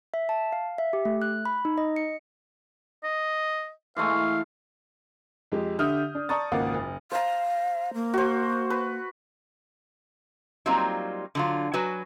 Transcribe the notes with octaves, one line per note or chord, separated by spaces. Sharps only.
E5
A5
F5
E5
G4
A3
F#6
B5
D#4
D#5
C#7
D#5
E3 G#3 A3 F5
F2 G#3 G4
D3 G4 E5 D#6 F6 G6
D4
D5 A5 A#5 C#6 D#6 A6
G#1 C#2 A#3 F5 F#5 D6
F#1
C5 F5 A#5
A#3
F#4 C5
B4
F#3 G3 A#3 C4 D#4 F4
D3 F#3 F4
F#3 F#4 B4 G#5